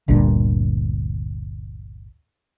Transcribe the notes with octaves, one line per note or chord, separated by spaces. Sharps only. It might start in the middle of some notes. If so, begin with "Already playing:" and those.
G1 D2 G2 A#2